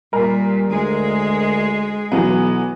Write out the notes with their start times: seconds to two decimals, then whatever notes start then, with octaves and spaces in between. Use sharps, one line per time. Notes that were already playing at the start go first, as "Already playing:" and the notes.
0.13 A#2 G3 A#4
0.69 D2 G#3 G#4
2.12 B1 E3 F#3 B3